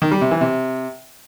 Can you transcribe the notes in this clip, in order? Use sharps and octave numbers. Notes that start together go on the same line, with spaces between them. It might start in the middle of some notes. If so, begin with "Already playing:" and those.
D#3
G3
C3
E3
C3